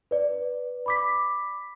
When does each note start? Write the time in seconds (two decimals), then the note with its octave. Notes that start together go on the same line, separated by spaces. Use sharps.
0.11 B4 D5
0.86 B5 D6 B6